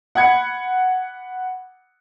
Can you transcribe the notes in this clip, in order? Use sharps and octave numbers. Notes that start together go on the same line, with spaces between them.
F#5 B5 G#6 C#7